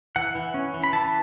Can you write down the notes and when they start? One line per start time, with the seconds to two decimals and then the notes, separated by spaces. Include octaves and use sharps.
0.16 E3 F#5
0.35 E3
0.54 C#4
0.74 E3
0.84 B5
0.93 E3 A5